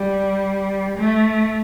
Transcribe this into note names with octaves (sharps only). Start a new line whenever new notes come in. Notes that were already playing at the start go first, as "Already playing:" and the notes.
Already playing: G3
A3